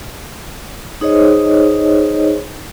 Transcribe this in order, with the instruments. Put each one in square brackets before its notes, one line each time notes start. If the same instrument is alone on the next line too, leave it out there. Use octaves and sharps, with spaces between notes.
[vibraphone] D#4 G#4 C5 C#5 D#5